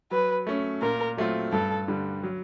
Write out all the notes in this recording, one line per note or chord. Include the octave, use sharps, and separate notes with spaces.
F#3 B4
A3 C#4
A#2 A#4
F#3 A3 C4 F4
G2 A4
D3 G3
F#3